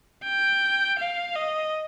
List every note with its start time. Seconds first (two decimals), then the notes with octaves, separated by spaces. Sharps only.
0.25 G5
0.99 F5
1.36 D#5